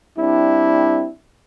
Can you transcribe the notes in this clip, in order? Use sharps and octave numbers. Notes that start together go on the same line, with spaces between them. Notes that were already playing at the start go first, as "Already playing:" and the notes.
G3 C4 D4 E4